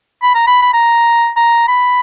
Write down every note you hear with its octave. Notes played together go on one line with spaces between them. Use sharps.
B5
A#5
B5
B5
A#5
A#5
B5